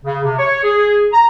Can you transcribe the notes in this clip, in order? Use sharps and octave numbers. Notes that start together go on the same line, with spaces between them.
C#3
C3
C#5
G#4
A#5